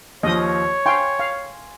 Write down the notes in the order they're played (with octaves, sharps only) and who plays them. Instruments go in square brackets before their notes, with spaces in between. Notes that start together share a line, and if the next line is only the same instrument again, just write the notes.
[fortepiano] D#2 F3 [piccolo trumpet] C#5 [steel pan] D#5 D#6
[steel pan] F5 G5 [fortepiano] G#5 C6 C#6
[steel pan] F5